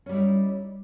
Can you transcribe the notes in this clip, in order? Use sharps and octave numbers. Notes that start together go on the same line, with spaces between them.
G3 C#4 D#4 E4